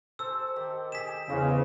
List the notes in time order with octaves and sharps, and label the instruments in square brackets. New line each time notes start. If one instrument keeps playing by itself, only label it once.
[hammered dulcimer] A4 C5 [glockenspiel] E6
[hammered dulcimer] D#3 G4
[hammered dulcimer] G4 G#4 [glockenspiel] B6 E7
[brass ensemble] E2 C#3 [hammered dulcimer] C5 D#5